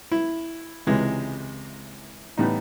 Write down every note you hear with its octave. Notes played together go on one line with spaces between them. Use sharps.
E4
C#2 C3 E3 G#3
A2 E3 G3 B3 D#4